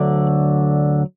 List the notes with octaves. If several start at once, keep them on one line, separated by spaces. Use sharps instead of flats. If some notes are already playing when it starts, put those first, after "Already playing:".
Already playing: D2 D3 F#3 D5